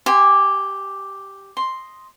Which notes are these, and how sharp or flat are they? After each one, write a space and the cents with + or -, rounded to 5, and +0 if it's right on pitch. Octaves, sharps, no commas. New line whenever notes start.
G4 +0 G#5 -30 C6 +0
D#5 +0 C6 +0